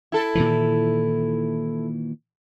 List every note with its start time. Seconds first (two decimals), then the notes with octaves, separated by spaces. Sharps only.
0.12 E4 A4
0.35 A#2 D#3 E3